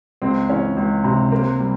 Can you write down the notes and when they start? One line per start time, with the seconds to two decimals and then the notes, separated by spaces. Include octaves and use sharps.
0.22 C#2 C4
0.49 E3 C#4
0.77 C#2
1.04 C3
1.32 A#3 C4
1.60 G3